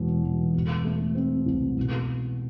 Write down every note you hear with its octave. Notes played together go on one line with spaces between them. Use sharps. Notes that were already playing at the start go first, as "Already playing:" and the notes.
Already playing: E1 E2 B2
E1
B2
A3
C4
C2
B2